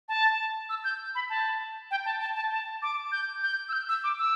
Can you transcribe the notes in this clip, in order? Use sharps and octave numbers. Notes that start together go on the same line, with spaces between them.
A5
E6
G6
B5
A5
G5
A5
A5
A5
A5
D6
G6
G6
E6
G6
E6
D6
E6